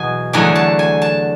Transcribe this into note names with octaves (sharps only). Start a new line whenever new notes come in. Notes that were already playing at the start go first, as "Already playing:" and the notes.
Already playing: E2 B2 F#3 G#5
E2 D3 F#3 A3 G#5
A5
G#5
A5